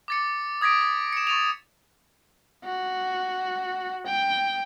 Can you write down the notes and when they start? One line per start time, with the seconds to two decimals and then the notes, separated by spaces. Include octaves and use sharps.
0.08 D6 A6 C#7
0.61 D#6 G#6 A#6 B6 D7
0.81 A6
1.13 C#7 E7
1.27 C#6 A6 D#7 F7
2.65 F#4
4.06 G5